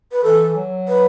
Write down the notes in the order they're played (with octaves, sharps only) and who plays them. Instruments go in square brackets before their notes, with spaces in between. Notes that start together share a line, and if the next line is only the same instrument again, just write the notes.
[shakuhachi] B4
[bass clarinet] E3 [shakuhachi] A4
[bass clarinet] F#3
[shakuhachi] B4